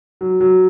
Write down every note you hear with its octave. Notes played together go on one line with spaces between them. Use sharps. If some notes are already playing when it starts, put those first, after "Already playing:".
F#3
F#3